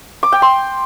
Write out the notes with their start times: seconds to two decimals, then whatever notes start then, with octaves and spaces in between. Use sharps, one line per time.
0.23 D6
0.32 G5
0.42 C6